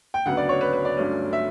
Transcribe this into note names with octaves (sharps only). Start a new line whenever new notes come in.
G5
D2 C#3 F#3 B3 F#5
D5
C#5
B4
B4
D5
G1 G2 F#3 A3 C#4
E5